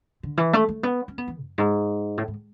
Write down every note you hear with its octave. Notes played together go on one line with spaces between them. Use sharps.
D3
E3
A3
A3
B3
C#4
B3
E3
F#2
G#2
A2
G#2